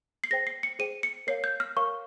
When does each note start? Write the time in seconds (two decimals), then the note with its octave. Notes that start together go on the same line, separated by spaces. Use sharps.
0.24 C7
0.31 G#4 C5 G5 A#6
0.47 C7
0.63 C#7
0.79 G#4 C5 G5 D#7
1.03 C#7
1.27 A#4 C#5 F5 C7
1.44 G6
1.60 F6
1.76 A#4 C#5 F5 C#6